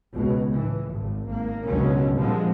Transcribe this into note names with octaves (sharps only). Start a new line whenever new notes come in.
C#2 B2
A2 E3
G#1 A2
G#1 A#3
G#1 C#2 B2 D3 F#3 C#4
A#2 D3 F3 G3 G#3 C4